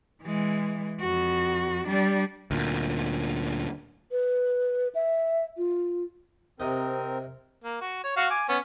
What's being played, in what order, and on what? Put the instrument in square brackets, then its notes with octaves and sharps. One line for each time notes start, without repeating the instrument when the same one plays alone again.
[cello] E3 G#3
F2 F#4
G3 D4
[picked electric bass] D2 A#2
[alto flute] B4
E5
F4
[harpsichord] C3 D#4 [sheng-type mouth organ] C4 A#4
[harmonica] A#3
F#4
C#5
F#4 F5 C#6
G#5 D6
B3 C#4